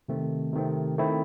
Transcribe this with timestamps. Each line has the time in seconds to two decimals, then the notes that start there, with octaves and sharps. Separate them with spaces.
0.08 C3 D#3 A3 C4
0.53 C3 D#3 A3 C4
0.98 D#3 A3 C4 E4